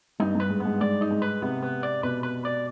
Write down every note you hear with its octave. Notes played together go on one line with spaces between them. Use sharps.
G2 D#4
G2 B4
G#2
B3
G#2
G#2 D5
D#4
G#2
B4
C3 B3
B3
D5
B2 B4
B4
D5